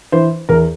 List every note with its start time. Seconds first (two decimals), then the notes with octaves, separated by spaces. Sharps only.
0.12 E3 C5
0.49 E2 A#4